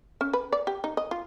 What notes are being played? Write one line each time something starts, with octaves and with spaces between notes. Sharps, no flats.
C#4
B4
D5
G4
D#4
D#5
F4